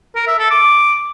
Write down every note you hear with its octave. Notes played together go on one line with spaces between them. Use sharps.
A#4
E5
A4
D6